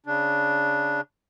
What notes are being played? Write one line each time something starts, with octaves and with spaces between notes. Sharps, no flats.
C#3 D4